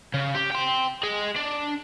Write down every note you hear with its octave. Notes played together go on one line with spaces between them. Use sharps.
C#3
G4
G5 C6
G#4 D#5
D4